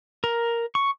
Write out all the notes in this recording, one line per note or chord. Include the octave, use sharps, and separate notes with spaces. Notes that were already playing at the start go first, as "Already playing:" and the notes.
A#4
C#6